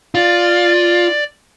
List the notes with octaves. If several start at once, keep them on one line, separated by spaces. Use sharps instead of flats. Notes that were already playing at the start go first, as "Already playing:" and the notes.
F4 D5